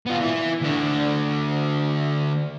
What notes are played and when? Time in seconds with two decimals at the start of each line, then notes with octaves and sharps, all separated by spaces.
0.06 B3 F4
0.19 E3 E4
0.61 D2 D4